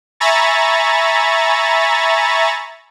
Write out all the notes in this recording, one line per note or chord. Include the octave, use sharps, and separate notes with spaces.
E5 G#5 A#5 B5 C#6 A6